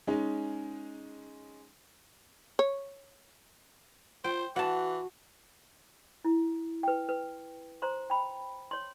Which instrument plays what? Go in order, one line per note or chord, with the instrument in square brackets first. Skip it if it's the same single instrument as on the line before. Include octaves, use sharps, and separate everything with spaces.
[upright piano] G#3 C#4 D#4
[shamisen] C#5
[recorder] F4 [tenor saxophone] C5 [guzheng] G5
[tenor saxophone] E3 [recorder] F#4 [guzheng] F#5 A5
[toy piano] E4
B4 G5
B4
C5 A#5 C6
G5 B5
C#5 C6